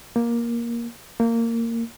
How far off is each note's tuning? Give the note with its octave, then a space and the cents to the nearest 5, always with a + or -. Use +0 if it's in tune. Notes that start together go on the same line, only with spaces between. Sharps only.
A#3 +10
A#3 -20